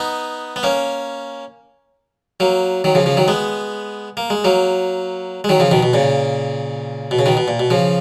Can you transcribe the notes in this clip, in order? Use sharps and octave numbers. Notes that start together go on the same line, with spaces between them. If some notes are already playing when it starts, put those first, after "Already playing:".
Already playing: B3 D#4
B3
A#3 C#4
F#3 A#3
D#3 F#3
C#3 F3
C#3 F3
D#3 F#3
G#3 B3
A#3
G#3
F#3 A#3
G#3
D#3 F#3
C#3 F3
B2 D#3
B2
A#2 C#3
B2
C#3
B2 D#3
B2
A#2
B2
C#3 F3